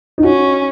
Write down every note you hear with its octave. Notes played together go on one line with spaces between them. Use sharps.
D#4
C#4 F#4